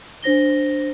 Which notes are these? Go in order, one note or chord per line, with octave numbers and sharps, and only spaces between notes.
D4 C5 A#6 G7